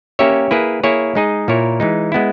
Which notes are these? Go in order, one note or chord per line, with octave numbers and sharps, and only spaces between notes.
A#3 C#4 G4 C#5 E5
A#3 E4 G#4 B4
A#3 E4 G#4 C#5
G#3 D#4 G#4 D#5
A#2 A#3 E4 A#4 C#5
E3 G#3 D#4
G#3 B3 E4